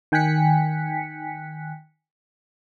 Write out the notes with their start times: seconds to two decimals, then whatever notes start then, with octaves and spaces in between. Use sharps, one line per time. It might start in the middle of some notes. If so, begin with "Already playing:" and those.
0.12 D#3 G5 G#5 F#6 B6 C#7